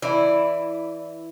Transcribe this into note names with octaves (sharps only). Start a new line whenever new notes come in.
E3 E4 D5